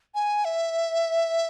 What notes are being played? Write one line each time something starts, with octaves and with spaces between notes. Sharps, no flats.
G#5
E5